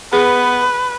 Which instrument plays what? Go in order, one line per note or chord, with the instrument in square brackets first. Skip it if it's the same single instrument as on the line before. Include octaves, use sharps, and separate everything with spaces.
[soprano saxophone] B3 [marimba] G#4 [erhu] B4